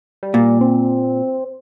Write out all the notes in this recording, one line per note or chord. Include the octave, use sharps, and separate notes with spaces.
G3
A#2
C4